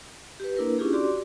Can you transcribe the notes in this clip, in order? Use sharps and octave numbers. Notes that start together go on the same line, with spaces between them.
G4 B4
A#3 D4 E4 A#4 B4
C#4 D4 E4 F4 G4 G#4
F#4 G4 D5 C6 D6